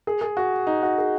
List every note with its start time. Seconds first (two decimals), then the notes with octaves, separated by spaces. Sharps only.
0.07 G#4
0.21 G#4
0.37 F#4
0.67 D#4
0.83 F#4
0.98 G#4